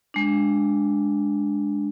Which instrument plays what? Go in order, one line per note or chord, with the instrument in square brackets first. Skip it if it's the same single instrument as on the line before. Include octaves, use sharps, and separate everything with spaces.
[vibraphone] G#3 D4